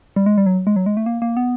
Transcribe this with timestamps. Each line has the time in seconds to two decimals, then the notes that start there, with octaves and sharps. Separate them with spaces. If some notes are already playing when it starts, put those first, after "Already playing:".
0.16 G3
0.26 G#3
0.38 G3
0.46 F#3
0.67 G#3
0.76 F#3
0.86 G#3
0.97 A3
1.06 A#3
1.22 A#3
1.37 B3